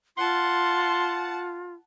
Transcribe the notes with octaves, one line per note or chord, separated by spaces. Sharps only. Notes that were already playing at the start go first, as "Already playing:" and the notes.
F4 F#5 A5 C6